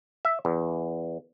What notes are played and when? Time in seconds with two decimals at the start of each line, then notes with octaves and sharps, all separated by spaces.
0.25 E5
0.45 E2